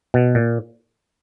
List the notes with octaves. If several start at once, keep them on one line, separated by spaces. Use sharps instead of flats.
B2
A#2